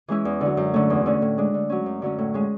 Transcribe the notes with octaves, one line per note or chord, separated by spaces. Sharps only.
E3 G#3 C#4 E4
E2
D3 F#3
F#2
D3 A3 C#4
E2
D3 A3 C#4
A2
G#3 D4
D3
F#3 C#4
F#2
D3 F#3 C#4
A2
G#3 C#4